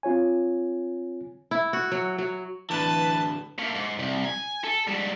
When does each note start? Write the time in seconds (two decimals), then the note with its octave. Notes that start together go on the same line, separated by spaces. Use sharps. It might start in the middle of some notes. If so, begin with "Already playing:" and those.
0.03 C4 F4 C#5 G#5
1.51 E4
1.73 F#4
1.92 F#3
2.18 F#3
2.70 A2 D3 E3 B4 A5
3.59 A3 A#3
3.75 G#2
3.99 C2
4.25 G#5
4.64 A4
4.87 G#2 G3